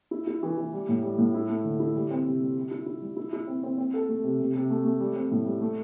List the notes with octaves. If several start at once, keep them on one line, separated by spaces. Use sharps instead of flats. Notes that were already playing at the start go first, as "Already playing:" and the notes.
E4
E4
E3
E3
G3
A2
G3
A2
E4
A3
D3
E4
G3
C4
C3
G3
G4
E4
E4
G3
E4
E4
C4
C4
C4
A4
A3
C3
C3
C3
A3
A3
G3
C4
A2
G3
A3